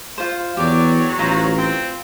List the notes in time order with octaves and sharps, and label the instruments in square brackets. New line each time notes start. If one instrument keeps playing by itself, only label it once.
[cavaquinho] F4 C5
[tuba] E2 [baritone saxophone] F#3 [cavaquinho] G4 D5
[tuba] A1 [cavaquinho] F4 C5 A#5
[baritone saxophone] C4